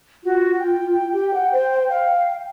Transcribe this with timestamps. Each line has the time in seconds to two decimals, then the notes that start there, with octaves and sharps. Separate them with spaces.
0.24 F4 F#4
0.59 G5
1.13 G4
1.34 F#5
1.52 C5
1.90 F5